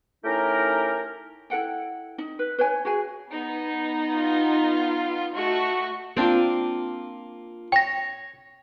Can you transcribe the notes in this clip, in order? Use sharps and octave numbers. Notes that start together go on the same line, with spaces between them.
A3 C#4 D#4 E4 G4 A#4
E4 A4 F#5 G5
D#4
B4
B4 C#5 G#5
F#4 G#4 G#5
B3 D#4
F4
A3 F#4 D#5 C#6
A#3 C4 D4 F4
C#5 G5 A#6